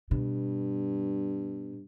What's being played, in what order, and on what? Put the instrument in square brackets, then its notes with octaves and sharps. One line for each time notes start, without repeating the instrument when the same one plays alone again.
[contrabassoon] G2 [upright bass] B2